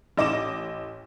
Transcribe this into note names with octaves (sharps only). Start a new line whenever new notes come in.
A1 D#5 D6 E7